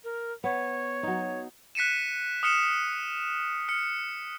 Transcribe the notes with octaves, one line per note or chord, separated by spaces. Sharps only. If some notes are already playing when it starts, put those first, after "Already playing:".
A#4
B3 C#5
F#3 D#4
F#6 B6 C#7 D#7 E7
D#6 F6 C#7 E7
F6 C#7